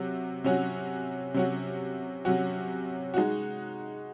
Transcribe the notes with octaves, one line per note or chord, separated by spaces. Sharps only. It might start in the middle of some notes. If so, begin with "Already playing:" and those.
Already playing: C3 F#3 F#4
C3 F#3 C#4 F#4
C3 F#3 C#4 F#4
C3 F#3 C#4 F#4
G#3 D#4 F#4